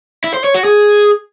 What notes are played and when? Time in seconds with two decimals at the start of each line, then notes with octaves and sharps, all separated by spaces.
0.24 E4
0.34 C5
0.44 C#5
0.54 F#4
0.65 G#4